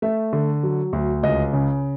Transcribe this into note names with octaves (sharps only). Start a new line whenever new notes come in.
A3 E5
D3
F#3
D2
C#2 D#5
C#3